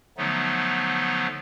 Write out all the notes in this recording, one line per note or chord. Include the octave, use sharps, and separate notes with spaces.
D3 F3 F#3 A3 B3 D#4